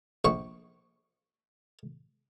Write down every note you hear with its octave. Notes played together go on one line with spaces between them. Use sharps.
A#1 C#6